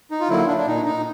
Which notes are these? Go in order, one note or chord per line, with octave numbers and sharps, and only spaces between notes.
D#4
F4
D3 F#3 A#3 E4
D4
D4
A#2 D#4
D#4